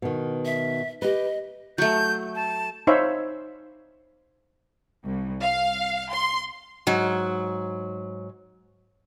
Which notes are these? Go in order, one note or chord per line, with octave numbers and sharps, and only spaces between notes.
B2 D#3
E5
G4 B4 D#5
F#3 A3 G6
A5
D#4 C5 C#5 E5 F5 B5
C2
F5
C6
G#2 F#3